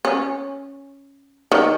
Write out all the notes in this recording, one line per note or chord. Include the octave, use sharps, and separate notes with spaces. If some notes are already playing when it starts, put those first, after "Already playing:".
C#4
D#3